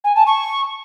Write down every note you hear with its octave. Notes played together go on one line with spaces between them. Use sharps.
G#5
A5
C#6